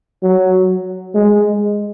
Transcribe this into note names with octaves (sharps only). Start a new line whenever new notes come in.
F#3
G#3